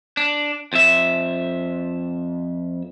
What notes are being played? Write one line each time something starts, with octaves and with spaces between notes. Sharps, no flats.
D4
F2 E5